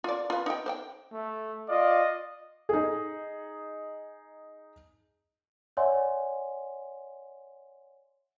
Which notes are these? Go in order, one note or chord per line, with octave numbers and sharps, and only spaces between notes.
F4 D5
F4 B4
D#4 G5
C5 D5 G5
A3
F4 D5 D#5 F5
D#4 G#4
C#5 D5 E5 F#5 G#5 C6